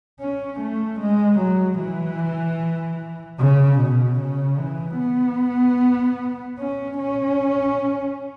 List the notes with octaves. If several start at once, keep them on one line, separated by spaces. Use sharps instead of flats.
C#4
A3
G#3
F#3
E3
C#3
B2
C#3
E3
B3
C#4
C#4